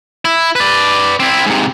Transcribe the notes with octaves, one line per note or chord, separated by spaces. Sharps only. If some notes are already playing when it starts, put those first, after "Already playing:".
E4
B4 D5
C4 E4
G#2 C3